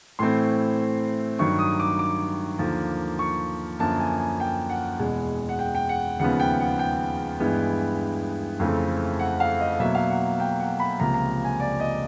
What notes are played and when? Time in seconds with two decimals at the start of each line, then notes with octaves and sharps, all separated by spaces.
0.19 A2 E3 A3 C4 C6
1.39 G2 D#3 F#3 C#6
1.59 D#6
1.80 D6
1.99 D6
2.59 D#2 D3 F3 A#3
3.19 C#6
3.79 F#2 D3 F3 A#3 A5
3.99 G#5
4.19 G#5
4.40 G5
4.69 F#5
4.99 E2 B2 G#3
5.49 F#5
5.59 G5
5.75 G5
5.89 F#5
6.19 D#2 C#3 F3 G#3 B3 F#5
6.40 G5
6.60 F#5
6.79 G5
7.40 G2 E3 G#3 B3
8.59 F2 C#3 E3 A3 C4
9.19 F#5
9.40 F5
9.60 D#5
9.80 B2 F#3 A#3 E5
9.95 F5
10.10 F#5
10.40 G5
10.60 F#5
10.80 B5
10.99 C#2 C3 F3 A#3 A#5
11.14 A#5
11.44 G#5
11.60 D5
11.80 D#5